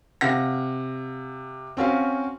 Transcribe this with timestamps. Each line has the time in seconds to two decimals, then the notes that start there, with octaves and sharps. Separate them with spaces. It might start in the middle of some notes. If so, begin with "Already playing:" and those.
0.21 C3 F5 F#5 A#6
1.77 C4 C#4 F#4 F5